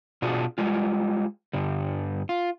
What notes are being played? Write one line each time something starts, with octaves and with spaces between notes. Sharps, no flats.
B2 D4 F4 F#4 G#4
G3 G#3 F4
G2 D3 G3
F4